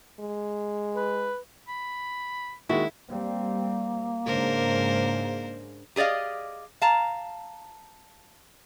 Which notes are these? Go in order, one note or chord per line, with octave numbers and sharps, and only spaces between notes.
G#3
B4
B5
D#2 D#3 G#3 E4 F#4
G3 A#3 C4
G#2 C#3 G#3 D4 A#4 C5
G4 G#4 D5 D#5 F5
F5 A5 A#5